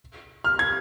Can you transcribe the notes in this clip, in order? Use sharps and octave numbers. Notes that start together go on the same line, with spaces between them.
F6
G#6